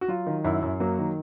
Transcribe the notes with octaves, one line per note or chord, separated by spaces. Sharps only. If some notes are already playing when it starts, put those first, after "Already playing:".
F#4
F#3 F4
D#3
F#2 E4
F#2
F#3 A#3
D#3